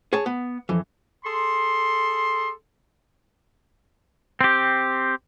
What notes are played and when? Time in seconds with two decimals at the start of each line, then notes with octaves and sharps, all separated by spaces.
0.13 G#4 C#5 A5
0.26 B3
0.69 F2 E3
1.24 G#4 A4 C6
4.41 C4 G4